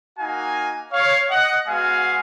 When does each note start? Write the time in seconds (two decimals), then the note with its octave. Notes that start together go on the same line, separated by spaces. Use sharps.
0.18 A#3 D#4 F#4 F5 G#5
0.92 C#5 F5
1.29 D#5 F#5
1.67 G#3 B3 F#4 F5 G#5